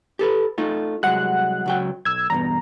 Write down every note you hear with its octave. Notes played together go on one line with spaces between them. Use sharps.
G4 A4 B4
A3 D#4 F4
C2 F#3 G#3 F#5 F#6
C#2 F#3 G5
B1 E6 G#6
E2 G2 B2 A#5